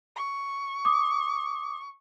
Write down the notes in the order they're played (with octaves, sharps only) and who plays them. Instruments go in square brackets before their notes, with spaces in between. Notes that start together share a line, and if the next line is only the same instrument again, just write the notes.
[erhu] C#6
[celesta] D6 D#6